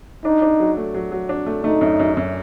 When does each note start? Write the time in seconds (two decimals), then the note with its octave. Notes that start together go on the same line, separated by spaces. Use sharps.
0.25 D4 D#4
0.42 D4
0.60 F#3
0.77 A3
0.94 F#3
1.12 F#3
1.29 D4
1.46 A3
1.64 A3 D#4
1.81 F#2
1.99 F#2
2.17 F#2